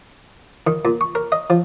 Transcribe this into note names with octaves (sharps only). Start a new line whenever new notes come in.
D#3
A#2
C#6
A#4
D#5
F3